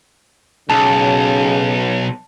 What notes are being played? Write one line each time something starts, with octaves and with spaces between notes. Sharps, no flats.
B1 C#3 A5